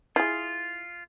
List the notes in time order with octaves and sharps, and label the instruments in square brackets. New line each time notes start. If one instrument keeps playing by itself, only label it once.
[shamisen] E4 G#4 [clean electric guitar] F4